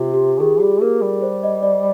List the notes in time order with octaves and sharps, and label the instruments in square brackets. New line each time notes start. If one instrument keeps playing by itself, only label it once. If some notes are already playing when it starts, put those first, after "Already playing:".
Already playing: [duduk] C3 [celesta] F4 G4
[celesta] G4
[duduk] D#3 [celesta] G#4
[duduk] G3 [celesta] G4
[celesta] G#4
[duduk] A#3 [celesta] A#4
[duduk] G3
[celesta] C5
D#5
D5